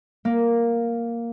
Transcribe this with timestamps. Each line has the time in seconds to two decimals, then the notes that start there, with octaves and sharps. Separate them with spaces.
0.25 A#3